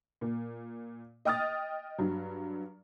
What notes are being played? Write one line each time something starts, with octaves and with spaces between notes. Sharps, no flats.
A#2
D#5 G5 D#6 F6 A6
G2 F#3